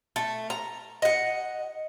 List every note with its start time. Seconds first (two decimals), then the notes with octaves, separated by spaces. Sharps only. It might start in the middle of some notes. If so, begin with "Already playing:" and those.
0.16 A3
0.50 A#5
1.02 D#5 F#5